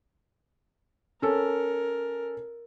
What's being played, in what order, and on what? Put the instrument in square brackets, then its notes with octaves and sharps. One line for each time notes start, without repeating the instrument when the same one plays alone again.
[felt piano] C#4 A4 [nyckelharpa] A#4